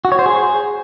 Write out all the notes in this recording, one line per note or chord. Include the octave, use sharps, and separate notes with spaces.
F#4
C#5
C5
G#4